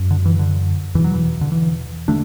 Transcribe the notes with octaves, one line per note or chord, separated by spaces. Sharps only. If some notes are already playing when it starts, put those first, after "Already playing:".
Already playing: F#2
D3
E3
D3
E2 B2 E3
F#3
E3
D3
E3
D3 A3 D4